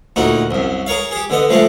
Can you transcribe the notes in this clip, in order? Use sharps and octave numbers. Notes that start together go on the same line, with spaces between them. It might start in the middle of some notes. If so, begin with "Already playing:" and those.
D2 A#2 D#4 F#4
C2 F#2
G#4 A#4 C#5 F5
G4 G#4
D3 B3 D#5
F3 G#3 A3 D4 F4